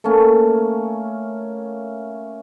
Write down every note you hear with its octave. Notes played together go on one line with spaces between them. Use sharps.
A3 A#3 C#4